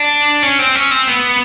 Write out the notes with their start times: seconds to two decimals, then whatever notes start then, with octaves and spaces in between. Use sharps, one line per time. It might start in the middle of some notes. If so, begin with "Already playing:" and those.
Already playing: D4
0.43 C#4
0.59 C4
0.75 C#4
0.91 C4
1.08 B3